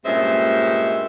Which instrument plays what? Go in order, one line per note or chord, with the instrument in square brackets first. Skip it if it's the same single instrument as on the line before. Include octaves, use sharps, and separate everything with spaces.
[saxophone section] G2 A#2 G#3 C4 C#4 E5